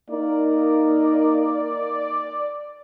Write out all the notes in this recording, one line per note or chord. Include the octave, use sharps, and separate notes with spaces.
A#3 D#4 A#4 D5